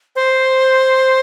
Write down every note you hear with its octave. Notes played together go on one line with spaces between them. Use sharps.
C5